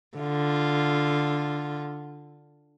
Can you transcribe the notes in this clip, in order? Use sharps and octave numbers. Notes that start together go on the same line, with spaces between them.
D3 F4